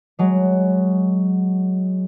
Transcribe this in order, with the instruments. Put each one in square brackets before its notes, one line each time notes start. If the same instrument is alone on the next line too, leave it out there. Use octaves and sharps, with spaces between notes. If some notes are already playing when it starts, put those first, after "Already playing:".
[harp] F#3 G#3